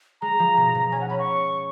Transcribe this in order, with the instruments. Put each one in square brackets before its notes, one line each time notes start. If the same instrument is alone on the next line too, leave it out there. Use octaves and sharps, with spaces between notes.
[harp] G#3 [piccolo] A#5
[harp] F3
B2
B2
[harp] C#4 [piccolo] G#5
[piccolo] F#5
[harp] C#4 [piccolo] B5
[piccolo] C#6